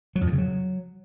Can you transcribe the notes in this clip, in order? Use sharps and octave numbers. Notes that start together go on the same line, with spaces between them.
F#3
F2
A#2
C#3
F#3